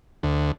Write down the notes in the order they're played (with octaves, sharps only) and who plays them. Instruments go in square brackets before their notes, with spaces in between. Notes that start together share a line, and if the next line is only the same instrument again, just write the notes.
[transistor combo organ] D2